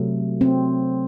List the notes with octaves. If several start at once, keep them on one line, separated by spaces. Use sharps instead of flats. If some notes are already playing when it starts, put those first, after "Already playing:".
Already playing: C3 F#3 A3
C4